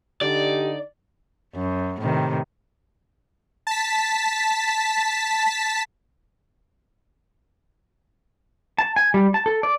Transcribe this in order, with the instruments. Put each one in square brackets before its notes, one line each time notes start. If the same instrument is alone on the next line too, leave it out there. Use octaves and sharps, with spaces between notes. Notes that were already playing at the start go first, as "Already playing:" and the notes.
[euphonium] D3 [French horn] D#4 [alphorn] G4 [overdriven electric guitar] D5
[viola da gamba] F#2
A2 C3 D#3
[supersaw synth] A5 B6
[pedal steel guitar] A5
G#5
G3
A5
A4
D5